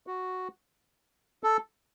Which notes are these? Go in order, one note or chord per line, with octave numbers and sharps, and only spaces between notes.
F#4
A4